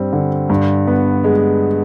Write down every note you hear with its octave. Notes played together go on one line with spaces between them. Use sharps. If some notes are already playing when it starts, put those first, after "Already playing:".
Already playing: G2 G3 C4
D3
G2
B3
G#3